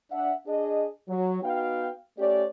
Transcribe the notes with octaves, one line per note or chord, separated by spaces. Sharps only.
D4 E5 F#5
D4 G#4 D#5
F#3
B3 D#4 F#4 F5 G5
A3 C#4 G4 C#5 D5